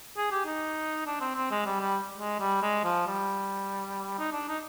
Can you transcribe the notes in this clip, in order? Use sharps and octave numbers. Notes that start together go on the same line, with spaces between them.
G#4
G4
D#4
D4
C4
C4
G#3
G3
G3
G#3
G3
G#3
F3
G3
D#4
D4
D#4